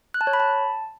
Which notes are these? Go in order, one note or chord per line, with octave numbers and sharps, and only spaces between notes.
F#6
A5
C#5
B5
A5